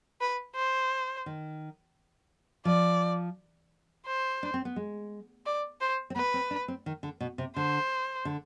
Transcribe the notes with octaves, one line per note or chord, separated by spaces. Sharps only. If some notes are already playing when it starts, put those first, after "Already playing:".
B4
C5
D#3
F3 D5
C5
D4
C4
B3
G#3
D5
C5
C4
B3 B4
C4
D4
C4
D#3
D3
B2
C3
D3 C5
D3